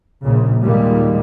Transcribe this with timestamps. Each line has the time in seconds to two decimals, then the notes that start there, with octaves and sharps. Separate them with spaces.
0.24 A#1 A#2 C#3
0.61 D#2 A#2 D#3 G3 G#3